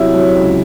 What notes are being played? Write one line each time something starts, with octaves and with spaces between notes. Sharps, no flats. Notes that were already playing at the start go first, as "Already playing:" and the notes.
Already playing: C3 F#3 E4
F#3
C#2